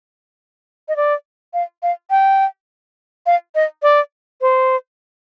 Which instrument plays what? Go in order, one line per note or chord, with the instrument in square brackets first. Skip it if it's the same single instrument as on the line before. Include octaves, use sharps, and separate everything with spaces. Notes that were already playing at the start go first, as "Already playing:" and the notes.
[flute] D#5
D5
F5
F5
G5
F5
D#5
D5
C5